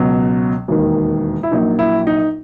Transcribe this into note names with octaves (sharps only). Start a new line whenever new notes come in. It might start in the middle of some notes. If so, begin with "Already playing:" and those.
Already playing: C#2 B2 F#3
E1 D#2 D#3
E4
A#1 A#2 F#3 D#4
E4
D#4